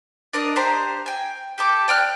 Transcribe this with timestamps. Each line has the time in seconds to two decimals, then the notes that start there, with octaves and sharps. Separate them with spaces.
0.33 D4 A#4 D5 D#5
0.56 D4 G4 C5 A#5
1.06 G5 G#5
1.58 G4 A4 D6
1.88 D5 G5 F6 F#6